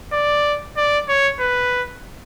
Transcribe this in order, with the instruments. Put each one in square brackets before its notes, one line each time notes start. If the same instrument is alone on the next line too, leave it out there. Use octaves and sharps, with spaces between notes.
[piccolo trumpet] D5
D5
C#5
B4